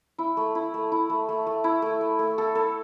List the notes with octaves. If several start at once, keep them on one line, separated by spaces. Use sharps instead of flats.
E4
A3
E4
A3
E4
A3
A3
A3
E4
A3
A3
A3
A4
A4